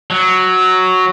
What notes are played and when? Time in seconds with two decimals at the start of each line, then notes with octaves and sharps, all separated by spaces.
0.11 F#3